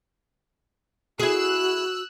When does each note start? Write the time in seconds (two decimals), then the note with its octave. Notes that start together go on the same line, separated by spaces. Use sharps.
1.20 E4 F#4 G#4 E6 F#6